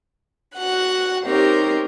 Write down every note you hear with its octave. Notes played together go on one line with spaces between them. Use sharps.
F#4 F#5 F#6
C4 D#4 G4 A#4 C#5